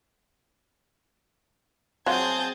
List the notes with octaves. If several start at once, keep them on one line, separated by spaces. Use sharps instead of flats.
F#3 C4 F4 G#4 A5 G6 G#6